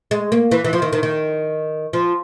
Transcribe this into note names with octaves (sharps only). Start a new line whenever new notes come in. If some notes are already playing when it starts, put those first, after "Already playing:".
G#3
A#3
E3
E3
F3
D#3
D#3
D#3
F3